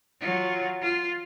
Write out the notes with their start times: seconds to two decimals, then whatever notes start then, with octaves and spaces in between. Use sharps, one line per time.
0.20 F#3 F4
0.81 F4